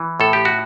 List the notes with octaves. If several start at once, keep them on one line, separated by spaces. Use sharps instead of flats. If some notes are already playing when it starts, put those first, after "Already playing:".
Already playing: E3
A2 A4
G4
F#4